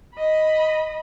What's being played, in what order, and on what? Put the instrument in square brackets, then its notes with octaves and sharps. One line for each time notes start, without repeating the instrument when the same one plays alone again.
[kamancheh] D#5 B5